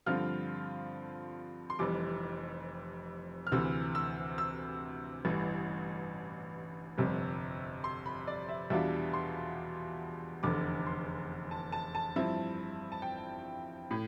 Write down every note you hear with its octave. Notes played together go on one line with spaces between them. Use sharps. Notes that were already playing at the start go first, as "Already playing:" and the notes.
G2 D3 F3 C4 F4 F6
C6
F1 F2 E3 G3 D6
F6
D2 C3 E3 E6
E6
E6
A1 G2 E3
G1 F2 C3 G3
C6
B5
D5
E5
E2 B2 G3 D4 F4 E5
C6
F1 E2 D3 D6
C6
A5
A5
A5
G2 F3 C4 E4
A5
G5
A2